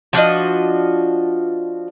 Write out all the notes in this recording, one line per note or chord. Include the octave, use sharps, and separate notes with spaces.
F3 D4 F#4 D#5